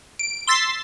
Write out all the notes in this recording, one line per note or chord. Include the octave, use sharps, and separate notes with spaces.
D7
C6 E6 A6 B6 C7